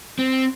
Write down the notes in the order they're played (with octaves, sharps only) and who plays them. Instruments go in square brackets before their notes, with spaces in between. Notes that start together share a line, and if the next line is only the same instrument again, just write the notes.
[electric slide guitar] C4